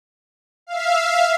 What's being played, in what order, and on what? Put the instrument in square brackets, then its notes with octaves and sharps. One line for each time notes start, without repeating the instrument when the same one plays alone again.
[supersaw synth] E5 F5